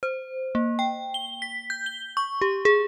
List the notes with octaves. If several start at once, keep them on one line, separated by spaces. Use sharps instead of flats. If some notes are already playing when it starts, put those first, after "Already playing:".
C5
A#3
G5
G7
B6
G6
G7
C#6
G4
G#4